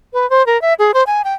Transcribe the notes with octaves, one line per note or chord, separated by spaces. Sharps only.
B4
C5
A#4
E5
G#4
C5
G#5
G5